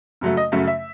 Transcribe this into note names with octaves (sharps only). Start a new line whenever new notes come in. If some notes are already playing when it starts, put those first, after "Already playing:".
F#2 C#3 F#3 A3
D#5
F#2 C#3 F#3 A3 E5
E5